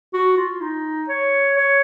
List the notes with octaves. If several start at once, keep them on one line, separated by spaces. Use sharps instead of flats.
F#4
F4
D#4
C#5
C#5